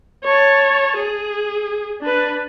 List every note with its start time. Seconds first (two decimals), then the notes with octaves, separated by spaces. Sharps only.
0.24 C#5 A5
0.97 G#4
2.01 D4 B4